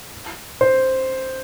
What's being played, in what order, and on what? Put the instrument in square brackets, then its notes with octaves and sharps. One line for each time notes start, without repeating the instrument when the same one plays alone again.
[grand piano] C5